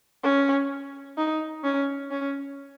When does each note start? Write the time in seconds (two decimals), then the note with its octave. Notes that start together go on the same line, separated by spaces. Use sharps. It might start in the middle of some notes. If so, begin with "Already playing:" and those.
0.23 C#4
1.17 D#4
1.64 C#4
2.11 C#4